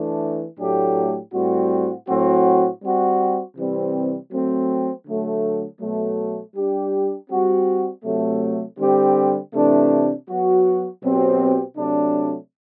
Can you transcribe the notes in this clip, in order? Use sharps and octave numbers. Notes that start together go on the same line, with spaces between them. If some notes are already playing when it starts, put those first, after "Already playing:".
Already playing: E3 A3 D4
A2 F#3 A3 D4 G4
A2 G3 C4 F#4
A2 F#3 C4 F#4
G3 C4 F#4
C3 E3 G3 C4
F#3 A3 C4
D3 F#3 A3
B2 F#3 A3
G3 D4 G4
G3 C4 F#4
C3 F#3 A3
D3 G3 C4 G4
C3 E3 A3 D4
F#3 B3 F#4
B2 F#3 C4 G4
C3 F#3 A3 D4